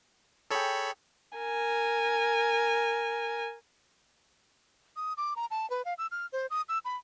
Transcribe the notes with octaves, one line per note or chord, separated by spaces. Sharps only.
G#4 A4 C#5 G5 B5
A#4 G#5
D#6
D6
A#5
A5
B4
F5
E6
F6
C5
D#6
E6
B5